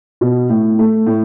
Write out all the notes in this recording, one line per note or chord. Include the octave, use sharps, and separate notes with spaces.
B2
A2
A3
A2